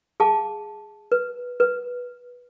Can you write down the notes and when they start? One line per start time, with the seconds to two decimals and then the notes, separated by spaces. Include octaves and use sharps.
0.20 G#4 F5 A5 D6
1.12 B4
1.60 B4